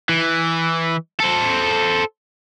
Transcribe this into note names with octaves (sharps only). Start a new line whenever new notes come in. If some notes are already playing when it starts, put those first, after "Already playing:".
E3
A4 C5